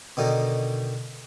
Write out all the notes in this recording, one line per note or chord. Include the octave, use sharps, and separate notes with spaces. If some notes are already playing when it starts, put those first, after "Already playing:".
B2 D3 D#3 D#4